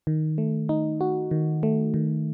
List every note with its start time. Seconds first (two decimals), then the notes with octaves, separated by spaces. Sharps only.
0.07 D#3
0.38 A3
0.69 D#4
1.01 F#4
1.31 D#3
1.63 A3
1.94 D#3